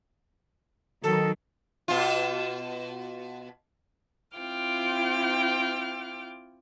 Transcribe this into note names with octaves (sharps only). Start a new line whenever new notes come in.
D#3 F#3 A4
B2 F4
C4 E4 F4 G5 D6 F6